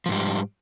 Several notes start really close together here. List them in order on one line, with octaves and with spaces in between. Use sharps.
F3 G#2 G3